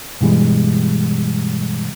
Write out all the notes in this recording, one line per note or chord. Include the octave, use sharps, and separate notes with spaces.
G2 B2 E3 G3 G#3